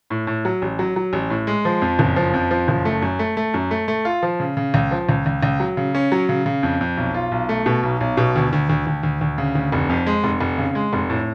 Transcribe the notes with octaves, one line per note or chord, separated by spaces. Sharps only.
A2
A2
F#3
A1
F#3
F#3
A1
A2
G#3
F3
F2
F#1
F3
F2
F3
F#1
A3
F#2
A3
A3
F#2
A3
A3
F4
F3
C#3
C#3
C#2
F3
C#2
C#2
C#2
F#3
C#3
C#4
F#3
C#3
C#3
F2
F2
B1
F4
B1
A3
B2
B1
B1
B2
D2
D2
D2
D2
D2
D2
C#3
D2
F1
F2
G#3
F1
F1
C#3
G#3
F1
A2